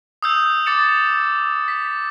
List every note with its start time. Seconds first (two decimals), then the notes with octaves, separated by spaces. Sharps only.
0.22 D#6 E6 G6
0.66 D6 A6 C#7 E7
1.68 B6